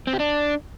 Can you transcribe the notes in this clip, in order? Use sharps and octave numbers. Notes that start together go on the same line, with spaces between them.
C4
G4
D4